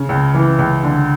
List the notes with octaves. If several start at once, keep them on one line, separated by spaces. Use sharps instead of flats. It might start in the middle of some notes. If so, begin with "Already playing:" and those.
Already playing: C#3
C#2
E3
C#2
D3